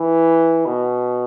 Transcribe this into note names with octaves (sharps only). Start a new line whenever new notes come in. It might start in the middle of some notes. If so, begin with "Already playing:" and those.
Already playing: E3
B2